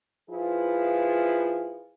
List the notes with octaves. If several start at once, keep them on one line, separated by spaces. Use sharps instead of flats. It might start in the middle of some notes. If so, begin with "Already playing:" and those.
F3 E4 F4 G#4 B4